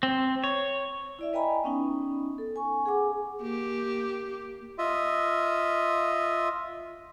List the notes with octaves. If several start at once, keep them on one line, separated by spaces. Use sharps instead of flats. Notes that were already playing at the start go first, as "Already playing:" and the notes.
C4
C#5
E4 D5 E5
B4 D#5 G5 G#5 A#5 B5
B3 C#4 D#4
A4
G#5 C#6
G#4 F#5 G#5 D6
A#3 G4
F4 D#5 E5